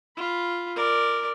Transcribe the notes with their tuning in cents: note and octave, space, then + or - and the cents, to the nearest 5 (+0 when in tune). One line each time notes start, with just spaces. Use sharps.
F4 +0 B5 +0
A#4 -10 D5 +5